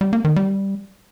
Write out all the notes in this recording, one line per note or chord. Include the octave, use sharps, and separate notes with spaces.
G3
A#3
D#3
G3